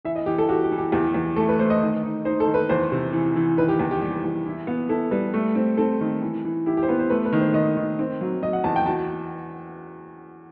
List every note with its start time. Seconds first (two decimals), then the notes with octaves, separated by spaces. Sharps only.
0.05 E3 E5
0.16 D#5
0.26 E3 G4
0.38 A4
0.49 F#4 G4
0.64 G4
0.71 E3
0.78 G4
0.92 E2 G4
1.14 E2
1.36 A3 A4
1.49 B4
1.59 A3 C5
1.70 D#5
1.82 D#3
2.03 D#4
2.25 D#4 C5
2.40 A4
2.47 D#3
2.54 B4
2.69 E2 C5
2.92 C3
3.13 E3
3.36 E3
3.57 D#3 B4
3.69 G4
3.79 E2
3.91 G4
4.01 G3 G4
4.24 E2
4.46 E4
4.67 B3
4.89 E4 A4
5.11 G3 B4
5.34 A3
5.55 C4
5.77 C4 A4
6.01 D#3
6.22 E3
6.45 E3
6.66 E4 G4
6.77 G4
6.83 C5
6.88 B3 B4
6.99 C5
7.10 A3 B4
7.25 B4
7.33 D#3
7.40 C5
7.54 D#3 D#5
7.77 D#3
7.99 C4
8.21 F#3
8.42 F#3 D#5
8.53 F#5
8.64 E2 A5
8.76 G5
8.86 F#4 A5